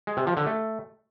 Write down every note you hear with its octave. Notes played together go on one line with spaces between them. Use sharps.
G#3
C3
F3
D3
A3